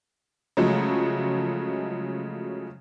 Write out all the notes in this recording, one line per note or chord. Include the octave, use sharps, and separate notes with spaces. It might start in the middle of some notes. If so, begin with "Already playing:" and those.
C#3 F3 F#3 G#3 A3